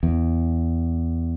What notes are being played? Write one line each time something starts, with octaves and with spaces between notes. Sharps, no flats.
E2